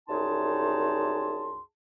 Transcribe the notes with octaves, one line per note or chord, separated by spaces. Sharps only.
C2 F#2 D#4 G#4 A5 C6